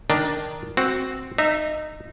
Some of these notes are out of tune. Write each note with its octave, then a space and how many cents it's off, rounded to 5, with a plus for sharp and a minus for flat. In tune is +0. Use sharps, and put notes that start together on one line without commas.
D#3 +0 D4 +0
C4 +0 F#4 +0
D#4 -20 E5 +5